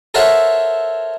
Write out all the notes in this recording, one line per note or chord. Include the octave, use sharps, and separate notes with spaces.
A4 A#4 C5 C#5 E5 F#5